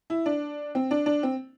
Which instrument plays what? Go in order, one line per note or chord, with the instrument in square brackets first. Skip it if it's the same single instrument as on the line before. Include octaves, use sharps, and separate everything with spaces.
[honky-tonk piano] E4
D4
C4
D4
D4
C4